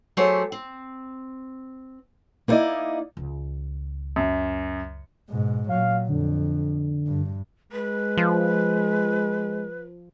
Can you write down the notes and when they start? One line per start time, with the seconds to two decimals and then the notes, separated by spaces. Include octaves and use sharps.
0.17 F#3 A3 G4 G#4 C5 C#5
0.52 C4
2.48 A#3 B3 D#4 E4 D5 D#5
3.17 C#2 D#3
4.16 F#2
5.30 G#2 B2
5.69 A#2 F#3 F5
6.08 F2 D3
7.07 G2
7.72 G#3 B4
8.17 F3